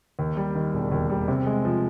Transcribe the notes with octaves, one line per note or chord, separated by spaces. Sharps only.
D#2
G3
D#3
E1
D#2
G3
C3
G#3
F3